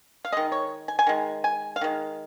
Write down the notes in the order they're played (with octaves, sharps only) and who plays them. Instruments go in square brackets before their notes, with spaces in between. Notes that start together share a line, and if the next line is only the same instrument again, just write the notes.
[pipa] F5
D#3 G#3 D#5
C#5
G#5
G#5
D#3 G#3
G#5
F5
D#3 G#3